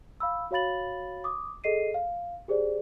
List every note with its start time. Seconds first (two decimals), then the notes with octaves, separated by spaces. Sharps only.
0.20 F5 B5 E6
0.51 F#4 C#5 F5 B5 A6 F#7
1.24 D6 D#6
1.64 G#4 A4 D#5 C7 D#7
1.94 F5
2.48 G4 G#4 C5 D5